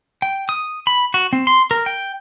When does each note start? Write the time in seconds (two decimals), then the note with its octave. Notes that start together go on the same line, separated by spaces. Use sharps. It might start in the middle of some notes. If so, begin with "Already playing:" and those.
0.22 G5
0.49 D#6
0.87 B5
1.14 F#4
1.33 C4
1.47 C6
1.71 A#4
1.86 G5